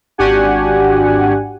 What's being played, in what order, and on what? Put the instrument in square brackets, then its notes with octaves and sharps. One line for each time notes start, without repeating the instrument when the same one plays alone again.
[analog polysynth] G#1 D4 F#4 G4 F#5 G#5